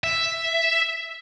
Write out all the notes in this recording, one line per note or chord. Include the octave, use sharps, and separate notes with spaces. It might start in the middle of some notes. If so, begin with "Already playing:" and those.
E5